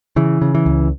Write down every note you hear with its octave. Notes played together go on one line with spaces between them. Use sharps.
C#3 E3
C#3
E3
C#2